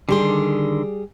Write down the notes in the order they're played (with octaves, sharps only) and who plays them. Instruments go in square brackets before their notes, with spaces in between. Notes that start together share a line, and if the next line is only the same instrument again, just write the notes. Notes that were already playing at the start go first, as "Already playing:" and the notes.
[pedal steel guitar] D3 D#3 C6 [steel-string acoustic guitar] G3 G4 G#4